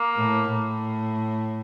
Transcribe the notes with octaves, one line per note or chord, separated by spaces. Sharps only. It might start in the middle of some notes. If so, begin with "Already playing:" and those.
Already playing: A#3
A2
A2